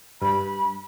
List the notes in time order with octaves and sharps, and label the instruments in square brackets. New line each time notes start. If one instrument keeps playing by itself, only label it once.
[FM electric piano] G2 [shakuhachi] B5